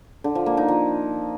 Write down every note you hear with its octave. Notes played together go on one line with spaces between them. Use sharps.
D3
F3
A#3
D#4
F3